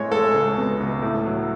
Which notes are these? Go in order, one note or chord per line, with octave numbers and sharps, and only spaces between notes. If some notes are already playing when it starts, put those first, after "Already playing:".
Already playing: A2 G#3 C#5
G#3 A4
C#2
B2
C#2
A2
F#3